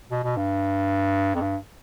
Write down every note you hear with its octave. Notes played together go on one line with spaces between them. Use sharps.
B2
B2
G2
F2
G2